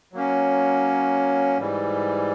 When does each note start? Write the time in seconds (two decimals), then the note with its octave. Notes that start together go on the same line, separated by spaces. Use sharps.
0.13 F#3 A#3 C#4
1.58 G#2 E3 G3